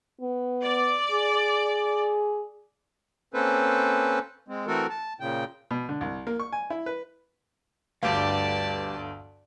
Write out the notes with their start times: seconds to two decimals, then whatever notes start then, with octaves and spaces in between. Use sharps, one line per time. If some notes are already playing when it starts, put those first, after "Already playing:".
0.21 B3
0.64 D5
1.12 G#4
3.34 A#3 C4 C#4 A4 B4 C5
4.48 G#3 C4
4.67 E3 A3 C4 F#4 A4 A#4
4.90 A5
5.20 A#2 C#3 G5
5.71 B2
5.89 D3
6.01 C2
6.27 A#3
6.40 C#6
6.52 G#5
6.70 E4
6.86 B4
8.03 G1 D2 G2 G4 D5 F5 A5